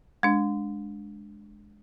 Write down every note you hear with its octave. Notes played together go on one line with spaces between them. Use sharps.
G#3 D4